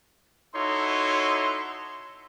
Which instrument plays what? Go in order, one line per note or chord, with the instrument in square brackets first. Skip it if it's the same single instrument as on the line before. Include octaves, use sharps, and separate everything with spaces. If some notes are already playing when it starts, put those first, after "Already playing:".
[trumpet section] D#4 E4 F#4 A4 C#5 C6